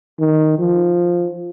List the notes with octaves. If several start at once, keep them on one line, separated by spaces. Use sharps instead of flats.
D#3
F3